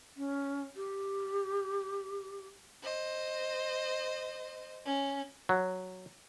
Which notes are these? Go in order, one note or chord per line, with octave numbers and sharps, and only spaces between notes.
C#4
G4
C5 D#5
C#4
F#3